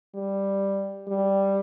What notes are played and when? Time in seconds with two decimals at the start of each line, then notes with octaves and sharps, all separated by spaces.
0.15 G3
1.08 G3